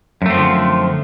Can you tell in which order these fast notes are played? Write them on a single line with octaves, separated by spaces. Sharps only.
F#2 A3 C4 F3 D3